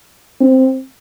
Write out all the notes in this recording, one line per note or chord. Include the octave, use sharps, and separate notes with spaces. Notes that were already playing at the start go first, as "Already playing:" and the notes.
C4